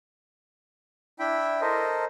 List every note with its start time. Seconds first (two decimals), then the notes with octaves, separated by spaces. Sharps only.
1.19 D4 E4 E5 G5 B5
1.61 A4 A#4 C5 D#5